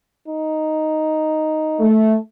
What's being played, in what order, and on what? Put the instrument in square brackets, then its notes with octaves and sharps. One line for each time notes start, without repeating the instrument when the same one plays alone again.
[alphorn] D#4
[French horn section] A3